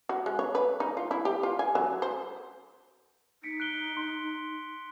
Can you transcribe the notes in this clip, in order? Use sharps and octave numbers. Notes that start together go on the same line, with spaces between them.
F#4
G#3
C#5
B4
D#4
F4
E4
G4
F4
G#5
F#3
C5
D#4 B6 C#7 D7
F#6 D7 G7
C6